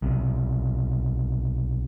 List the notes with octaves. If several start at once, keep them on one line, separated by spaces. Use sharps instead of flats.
B1 C3